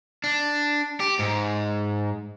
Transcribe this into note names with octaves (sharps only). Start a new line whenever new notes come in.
D4
G4
G#2